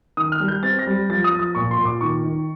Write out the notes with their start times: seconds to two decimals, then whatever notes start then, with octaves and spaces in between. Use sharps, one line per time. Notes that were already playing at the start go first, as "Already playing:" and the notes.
0.17 D#3 D#6
0.32 F6
0.40 G3
0.48 G6
0.63 C4 A6
0.79 A#6
0.87 G3
1.09 F3 A6
1.24 D#6
1.32 F3
1.39 D#6
1.55 A#2 C#6
1.71 C6
1.78 A#2
1.85 D6
2.01 D#3 C#6
2.24 D#3